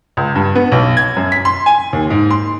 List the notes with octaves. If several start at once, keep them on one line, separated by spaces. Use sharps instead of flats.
C#2
G2
B3
B1
G#6
F#2
B6
C6
G#5
D#2
G#2
C6